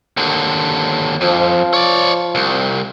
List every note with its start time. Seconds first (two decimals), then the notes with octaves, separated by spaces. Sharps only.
0.17 D#2 D3
1.21 F2 F3
1.73 C#5 D5
2.35 C2